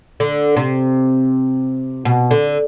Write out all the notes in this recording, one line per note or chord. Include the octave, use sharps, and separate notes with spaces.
D3
C3
B2
D3